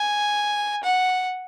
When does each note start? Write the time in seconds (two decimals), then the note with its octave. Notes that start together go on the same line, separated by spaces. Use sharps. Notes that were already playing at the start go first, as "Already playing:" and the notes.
Already playing: G#5
0.84 F#5